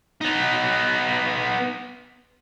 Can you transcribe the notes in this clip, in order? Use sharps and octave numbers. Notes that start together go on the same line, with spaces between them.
B3 D#4